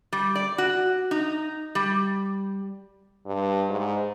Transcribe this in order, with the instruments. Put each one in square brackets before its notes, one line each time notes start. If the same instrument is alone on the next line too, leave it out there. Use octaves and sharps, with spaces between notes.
[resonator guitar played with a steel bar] G3
D5
F#4
D#4
G3
[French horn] G2
G#2